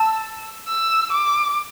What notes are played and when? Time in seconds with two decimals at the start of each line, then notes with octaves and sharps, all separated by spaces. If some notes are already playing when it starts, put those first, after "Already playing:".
Already playing: A5 E6
0.68 E6
1.12 D6